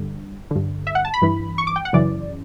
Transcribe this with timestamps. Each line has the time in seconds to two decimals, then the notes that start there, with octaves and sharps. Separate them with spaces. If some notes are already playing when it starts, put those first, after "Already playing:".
Already playing: G2 D3
0.51 G2 D3
0.87 E5
0.95 F#5
1.05 A5
1.14 B5
1.22 G2 E3
1.58 C#6
1.67 D6
1.76 G5
1.85 F#5
1.93 F#2 C#3 E3 D5